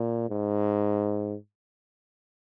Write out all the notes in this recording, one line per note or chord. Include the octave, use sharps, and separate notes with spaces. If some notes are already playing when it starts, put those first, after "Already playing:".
Already playing: A#2
G#2